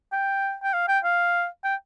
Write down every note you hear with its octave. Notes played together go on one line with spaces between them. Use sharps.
G5
G5
F5
G5
F5
G5